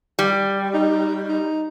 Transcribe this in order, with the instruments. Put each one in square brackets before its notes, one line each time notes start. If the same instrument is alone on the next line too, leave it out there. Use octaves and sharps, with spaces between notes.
[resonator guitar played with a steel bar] G3
[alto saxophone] D#4
D#4